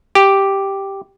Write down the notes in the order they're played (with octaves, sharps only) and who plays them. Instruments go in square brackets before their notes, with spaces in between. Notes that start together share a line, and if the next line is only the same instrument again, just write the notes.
[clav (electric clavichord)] G4